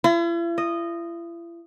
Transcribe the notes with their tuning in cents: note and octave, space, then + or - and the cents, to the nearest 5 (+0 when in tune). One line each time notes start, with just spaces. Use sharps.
E4 +45
D#5 -10